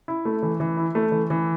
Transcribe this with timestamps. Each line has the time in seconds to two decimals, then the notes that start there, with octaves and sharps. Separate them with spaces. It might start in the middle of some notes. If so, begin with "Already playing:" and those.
0.08 E4
0.25 A3
0.43 E3
0.60 E3
0.77 E4
0.95 A3
1.12 E3
1.30 E3